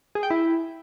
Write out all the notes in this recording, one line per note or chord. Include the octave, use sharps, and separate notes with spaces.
G#4
G5
E4